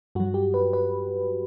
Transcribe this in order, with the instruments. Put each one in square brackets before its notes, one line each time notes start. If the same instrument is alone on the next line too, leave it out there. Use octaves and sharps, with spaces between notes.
[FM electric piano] G2 F#3 F#4
G4
B4
B4